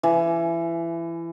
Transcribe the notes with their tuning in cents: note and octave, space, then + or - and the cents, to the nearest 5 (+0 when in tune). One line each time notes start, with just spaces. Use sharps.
E3 +25